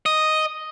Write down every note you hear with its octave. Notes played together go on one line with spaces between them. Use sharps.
D#5